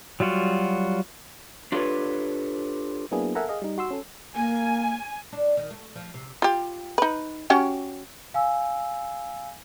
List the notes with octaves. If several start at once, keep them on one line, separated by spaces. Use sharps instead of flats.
F#3 G3 F4 F#4
D4 F4 G4 A4 B4 C#5
F#3 A#3 B3 D4 E4 G#4
A4 A#4 E5 F#5 G#5 A#5
G#4 D#5 F5
G3 D#4
F#4 C6 E6
C#4 A4
A#3 G#5
D4
D#3
A3
F3
C3
F4 G4
D#4 B4
C#4 F#4 G4
F5 G#5 E6